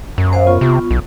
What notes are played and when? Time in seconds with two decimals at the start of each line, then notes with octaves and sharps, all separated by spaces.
0.18 F#2
0.33 C5 F5
0.46 B3 F4 C#6
0.61 C3
0.91 B1